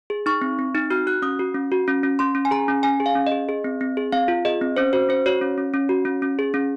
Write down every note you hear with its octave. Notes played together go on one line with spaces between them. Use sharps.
G#4
D#4 C#6
C4
C4
D#4
F#4 F6
F#4 F#6
C#4 D#6
F#4
C#4
F#4
C#4
C#4
C#4 C6
C#4
G#5
G#4 A#5
C#4
C#4 G#5
G#4
F5
C#4
D#5
G#4
G#4
C4
C4
G#4
C4 F5
F4
G#4 D#5
C4
C#4 C5
F#4 C5
C#4 C5
F#4 C#5
C#4
C#4
C#4
F#4
C#4
C#4
G#4
C#4